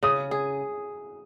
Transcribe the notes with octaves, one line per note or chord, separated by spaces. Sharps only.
C#3 D#6
G#4